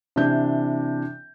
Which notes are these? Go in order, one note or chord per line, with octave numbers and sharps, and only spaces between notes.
C3 E3 D4 G6